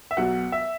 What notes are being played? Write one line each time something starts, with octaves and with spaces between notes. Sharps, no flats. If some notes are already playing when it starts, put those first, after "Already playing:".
E5
B1 B2 F#3 F#5
E5